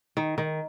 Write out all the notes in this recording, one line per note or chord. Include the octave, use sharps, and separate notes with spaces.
D#3
D#3